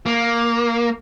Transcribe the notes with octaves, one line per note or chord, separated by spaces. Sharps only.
A#3